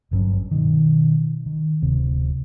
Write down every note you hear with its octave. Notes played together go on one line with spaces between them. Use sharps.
G1 G2 F#3 C#4
B2 D#3
D#3
D1 C3